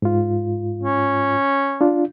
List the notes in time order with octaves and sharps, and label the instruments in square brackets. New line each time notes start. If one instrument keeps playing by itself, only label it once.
[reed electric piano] G#2 F4
[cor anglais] C#4
[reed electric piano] D4 F4